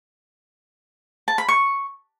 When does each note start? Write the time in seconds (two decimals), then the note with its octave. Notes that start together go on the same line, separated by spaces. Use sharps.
1.28 A5
1.38 B5
1.48 C#6